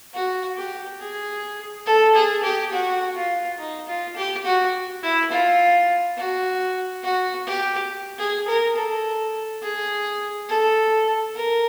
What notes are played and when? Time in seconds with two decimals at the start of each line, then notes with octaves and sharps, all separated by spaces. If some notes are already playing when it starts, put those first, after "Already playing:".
0.14 F#4
0.56 G4
1.00 G#4
1.86 A4
2.14 G#4
2.43 G4
2.72 F#4
3.16 F4
3.59 D#4
3.87 F4
4.16 G4
4.45 F#4
5.03 E4
5.31 F4
6.17 F#4
7.03 F#4
7.47 G4
8.18 G#4
8.48 A#4
8.75 A4
9.62 G#4
10.49 A4
11.35 A#4